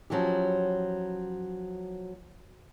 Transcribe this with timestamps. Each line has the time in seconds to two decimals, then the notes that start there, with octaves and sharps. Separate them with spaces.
0.10 F3 F#3 C#4 E4 G4